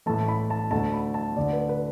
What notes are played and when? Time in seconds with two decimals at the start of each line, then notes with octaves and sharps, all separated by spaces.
0.06 A2 E3 A3 A5
0.28 B5
0.50 A5
0.71 D2 D3 A3 A5
0.94 B5
1.14 A5
1.36 D2 D3 A3 D5
1.53 B4
1.69 B4